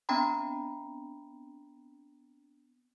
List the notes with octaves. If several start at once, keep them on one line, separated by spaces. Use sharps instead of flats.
B3 C4 D4 G5 A#5 B5